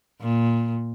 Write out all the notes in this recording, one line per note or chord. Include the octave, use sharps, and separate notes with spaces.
A#2